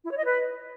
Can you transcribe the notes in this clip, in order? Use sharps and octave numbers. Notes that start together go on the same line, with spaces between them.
E4
C#5
D#5
B4